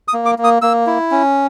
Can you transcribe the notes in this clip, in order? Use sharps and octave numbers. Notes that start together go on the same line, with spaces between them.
D#6
A#3
D6
A#3
D#6
A#3 E6
E4
C#4